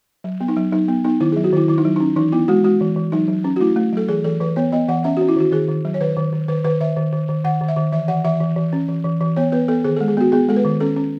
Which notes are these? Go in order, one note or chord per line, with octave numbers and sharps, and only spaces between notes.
F#3
B3
D#4
F#3
F#3 D#4
B3
B3 D#4
D#3 E4
G#4
F#3
F#4
D#3 E4
D#3 E4
D#4
F#3
D#4
C#4
E3 D#4
B3 E4
G#3 F#4
G#3 F#4
E3
E3
F#3 D#4
F#3
C#4
F#4
A3 E4
A3
F#3 A4
E3 G#4
E3 A4
E3 B4
B3 C#5
B3 D#5
E3 F#5
C#4 E5
F#4
C#4
E4
D#3 F#4
D#3 G#4
D#3
F#3
C#5
D#3 B4
D#3
D#3
D#3 B4
D#3 B4
D#3 E5
D#3
D#3
D#3
D#3 F#5
D#3
E5
D#3
E3 E5
E3 F#5
E3 E5
E3
E3
C#4
E3
E3
E3
B3 C#5
B3 B4
B3 A4
D#3 G#4
A4
G#3
G#4
B3 F#4
B3 G#4
G#3 A4
B4
D#3
C#4 A4
C#4